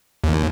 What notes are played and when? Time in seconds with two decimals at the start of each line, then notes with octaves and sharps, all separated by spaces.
0.24 D#2